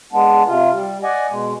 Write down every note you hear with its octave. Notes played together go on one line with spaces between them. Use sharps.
G#3 B3 D4
C3 F4
G3
D5 D#5 F#5 G#5
B2 G#3